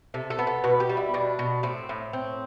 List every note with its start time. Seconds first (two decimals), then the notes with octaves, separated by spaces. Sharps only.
0.14 C3 A4
0.30 A4
0.39 B3
0.47 A4
0.64 B2 B4
0.80 G4
0.89 G3
0.97 E4
1.14 B2 D4
1.39 B2
1.63 A2 C4
1.89 A2
2.13 C4